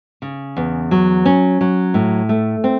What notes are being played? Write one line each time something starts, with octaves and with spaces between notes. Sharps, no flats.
C#3
E2
F#3
C#4
F#3
A2
A3
C4